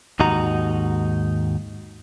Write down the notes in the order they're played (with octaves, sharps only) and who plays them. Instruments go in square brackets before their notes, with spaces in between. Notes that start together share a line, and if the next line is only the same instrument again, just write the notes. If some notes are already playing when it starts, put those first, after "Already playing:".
[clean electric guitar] D#2 G#2 D#4 F#4 A#5